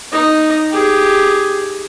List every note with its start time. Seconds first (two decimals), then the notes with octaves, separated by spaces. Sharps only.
0.12 D#4 D#5
0.71 G4 G#4